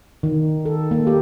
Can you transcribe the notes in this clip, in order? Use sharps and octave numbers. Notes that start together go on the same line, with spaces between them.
D#3
A4
A#3
G4